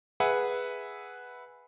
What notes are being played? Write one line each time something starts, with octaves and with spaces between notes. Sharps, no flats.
G#4 B4 E5 F#5